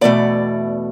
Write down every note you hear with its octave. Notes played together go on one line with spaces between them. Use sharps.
E2 B2 A3 D5